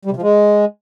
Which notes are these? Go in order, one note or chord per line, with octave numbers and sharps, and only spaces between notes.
G3
C3
F3
G#3